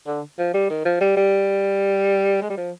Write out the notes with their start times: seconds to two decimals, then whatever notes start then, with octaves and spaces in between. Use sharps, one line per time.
0.07 D3
0.39 F3
0.54 G3
0.70 D#3
0.85 F3
1.01 G3
1.17 G3
2.42 G#3
2.50 G3
2.57 F3